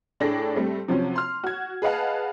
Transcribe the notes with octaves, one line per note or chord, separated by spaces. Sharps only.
A2 D4 G#4 A4 G5 A#6
G3 A3 C4
C3 F3 F#3 C4 C#4
C6 F6
F#4 G#6
G#4 B4 D#5 F5 F#5 A5